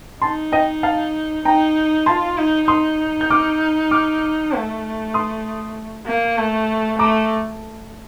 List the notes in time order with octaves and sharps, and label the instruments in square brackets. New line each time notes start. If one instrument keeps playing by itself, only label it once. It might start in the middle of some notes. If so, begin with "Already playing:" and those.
[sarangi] D#4 [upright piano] A5 C6
[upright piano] D#5 G5
F5 A5
[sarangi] D#4 [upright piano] G5 A#5
[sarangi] F4 [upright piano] A5 C6
[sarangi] D#4
[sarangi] D#4 [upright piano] C6 D#6
[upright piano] G6
D6 F6
D6 F6
[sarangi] A3
[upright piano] C6 D#6
[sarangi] A#3
A3
[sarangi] A3 [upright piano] A#5 D6